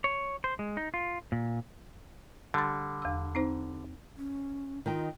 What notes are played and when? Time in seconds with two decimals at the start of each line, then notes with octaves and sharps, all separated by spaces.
0.04 C#5
0.44 C5
0.59 G#3
0.77 D#4
0.94 F4
1.32 A#2
2.54 D3 G3 C6 A6
3.02 E2 E6
3.35 C4 D#4 C5
4.17 C#4
4.86 D#3 D#4 F4 G5